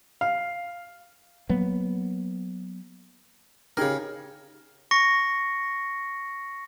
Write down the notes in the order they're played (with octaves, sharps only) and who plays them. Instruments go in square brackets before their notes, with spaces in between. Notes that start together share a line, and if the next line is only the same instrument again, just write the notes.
[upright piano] F5
[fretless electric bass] F#3 A#3 B3
[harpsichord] C#3 A#4 [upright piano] D#4 G4 G#4
[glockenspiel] C#6 A#6 C#7